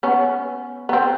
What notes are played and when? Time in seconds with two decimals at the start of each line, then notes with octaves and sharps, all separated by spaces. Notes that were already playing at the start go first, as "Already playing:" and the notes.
0.03 B3 C#4
0.89 B3
0.93 C4